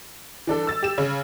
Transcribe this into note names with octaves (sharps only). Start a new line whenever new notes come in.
E3 D4 A4
E6 A6
G4 E7
C#3